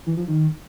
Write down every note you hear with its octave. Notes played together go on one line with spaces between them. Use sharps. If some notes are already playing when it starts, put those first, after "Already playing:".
E3
F3
D#3